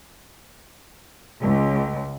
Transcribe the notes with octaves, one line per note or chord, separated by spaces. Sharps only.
C#2